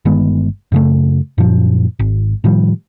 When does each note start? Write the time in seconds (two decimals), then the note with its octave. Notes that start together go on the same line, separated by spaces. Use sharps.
0.05 G1 D#3 G#3 B3
0.72 F#2 C#3 A3
1.38 F#2 A#2 F3
1.99 G#1
2.44 A2 D#3 F3 G3